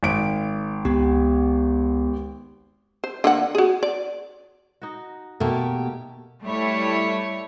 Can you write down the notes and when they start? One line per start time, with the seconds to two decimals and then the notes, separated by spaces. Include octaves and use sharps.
0.03 G#1 D7
0.85 C#2 B3 G4
3.04 C5
3.24 D3 A#3 F#5
3.55 F#4 G#4
3.83 D5
4.82 D#4 F#4
5.40 B2 A3 A#3 G4
6.43 G3 A3 E4 C#5